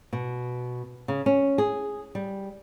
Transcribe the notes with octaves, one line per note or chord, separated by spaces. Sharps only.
B2
C#3
C#4
G#4
G3